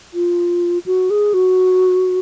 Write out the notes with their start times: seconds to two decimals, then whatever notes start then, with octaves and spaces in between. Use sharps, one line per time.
0.14 F4
0.86 F#4
1.10 G#4
1.34 F#4